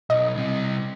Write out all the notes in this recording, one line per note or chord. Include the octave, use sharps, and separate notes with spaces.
B1 D#5
C2 C3